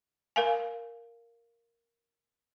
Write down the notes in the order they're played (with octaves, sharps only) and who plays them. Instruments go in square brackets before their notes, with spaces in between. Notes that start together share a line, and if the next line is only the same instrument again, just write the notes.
[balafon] A#4 F5 G#5